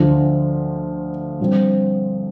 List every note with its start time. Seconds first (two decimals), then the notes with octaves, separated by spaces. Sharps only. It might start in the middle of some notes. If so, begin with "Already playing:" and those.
Already playing: D2 D3 F3
1.40 G2 F3 C4